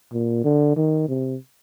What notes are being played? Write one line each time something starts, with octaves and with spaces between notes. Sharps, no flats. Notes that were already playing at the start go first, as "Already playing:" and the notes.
A#2
D3
D#3
C3